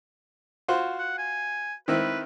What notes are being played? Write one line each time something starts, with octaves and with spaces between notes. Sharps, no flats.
F4 F#4 C5
F#5
G#5
D#3 C4 E4 B4